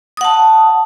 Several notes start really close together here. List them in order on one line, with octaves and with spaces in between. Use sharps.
D#6 F#5 A5